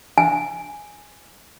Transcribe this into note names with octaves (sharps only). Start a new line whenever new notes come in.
G#5